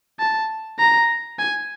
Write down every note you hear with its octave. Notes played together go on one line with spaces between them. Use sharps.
A5
A#5
G#5